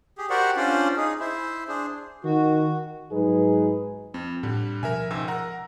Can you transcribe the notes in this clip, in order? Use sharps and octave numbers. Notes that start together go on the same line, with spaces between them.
G4 G#4
F#4 G4 A#4 C5 D5 F#5
C#4 D4 F4 C5 D5
D#4 G#4
E4 C5
D4 G#4 C5
D#3 F#4
G#2 F#3 D#4 G#4 B4
F2 C4
A2 D3 G3
B2 F3 A#4 E5 G#5
C#2 G#2 E6
A#4 F#5 A#5